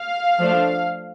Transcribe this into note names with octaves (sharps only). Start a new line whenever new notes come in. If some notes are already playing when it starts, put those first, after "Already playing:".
Already playing: F5
F3 A3 D4